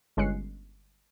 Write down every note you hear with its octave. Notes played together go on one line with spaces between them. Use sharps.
G1 G#3 C#4 F#6 C7 C#7